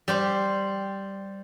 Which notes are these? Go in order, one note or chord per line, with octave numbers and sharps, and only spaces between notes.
G3 G4 C5